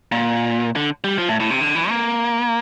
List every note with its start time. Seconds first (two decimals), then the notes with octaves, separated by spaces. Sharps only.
0.12 A#2
0.76 D3
1.04 G3
1.18 F3
1.29 A2
1.40 A2
1.50 C3
1.61 D3
1.75 E3
1.89 A#3